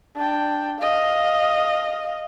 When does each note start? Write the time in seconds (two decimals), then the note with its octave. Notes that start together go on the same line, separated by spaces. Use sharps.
0.16 D4 G5
0.79 D#5 F5